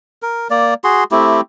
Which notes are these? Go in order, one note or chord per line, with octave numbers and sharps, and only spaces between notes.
A#4
A#3 D5
F#4 G#4 C6
A3 C4 E4 G4